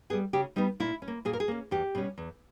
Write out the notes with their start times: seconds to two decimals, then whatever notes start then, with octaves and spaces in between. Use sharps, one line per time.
0.10 B3 G#4
0.13 G3
0.33 C#3 G4
0.56 G3 B3 D#4
0.80 A#2 E4
1.02 C#4
1.08 A#3
1.25 A#2 G#4
1.33 A#4
1.40 G#4
1.48 A#3 C#4
1.71 E2 G4
1.95 B2 G3 C#4
2.18 E2